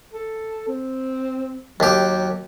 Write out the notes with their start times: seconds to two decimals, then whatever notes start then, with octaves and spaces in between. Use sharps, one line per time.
0.13 A4
0.68 C4
1.80 D#2 F#3 G4